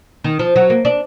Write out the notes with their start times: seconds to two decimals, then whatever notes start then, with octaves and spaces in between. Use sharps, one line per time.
0.24 D#3
0.39 F3
0.56 F#3
0.70 A#3
0.85 D4